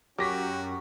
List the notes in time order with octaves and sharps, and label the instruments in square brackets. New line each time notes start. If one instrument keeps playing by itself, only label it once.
[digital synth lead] F#2 [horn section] C#4 G4 [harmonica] F#4 [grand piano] D6 A#6 B6